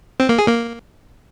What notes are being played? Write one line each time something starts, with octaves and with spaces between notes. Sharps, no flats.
C4
A#3
G#4
A#3